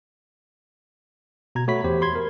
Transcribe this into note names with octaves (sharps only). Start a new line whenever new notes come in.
B2 A#5 G#6
A3 F#4 C#5 B5 B6
E2 G4 C5
B5 C6 G#6
A#4